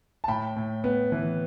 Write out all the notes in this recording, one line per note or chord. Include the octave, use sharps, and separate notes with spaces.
A5
A2 G5 B5
A2
B3
E3